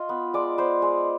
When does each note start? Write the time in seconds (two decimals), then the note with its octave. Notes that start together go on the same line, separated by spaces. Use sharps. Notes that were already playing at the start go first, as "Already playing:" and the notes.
Already playing: F4 D#5
0.09 B3
0.34 G#3 D5
0.58 B3 C5
0.82 G#3